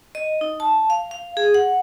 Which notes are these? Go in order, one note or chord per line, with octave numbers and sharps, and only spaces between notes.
D#5
D#4
A5
F5
F5
G#4
F#5